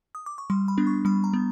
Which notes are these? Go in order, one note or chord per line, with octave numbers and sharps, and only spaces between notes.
D#6
D6
C#6
G3 C6
B5
B3 D4
C#6
G3 B5
A#5
B3